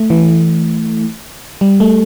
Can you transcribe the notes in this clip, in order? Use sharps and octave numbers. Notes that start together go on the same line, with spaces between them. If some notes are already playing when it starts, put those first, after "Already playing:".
Already playing: A3
E3
G3
A3